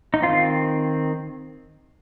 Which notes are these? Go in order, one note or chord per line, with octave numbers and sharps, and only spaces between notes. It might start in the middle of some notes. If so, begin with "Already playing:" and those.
D#4
D#3 C4 F4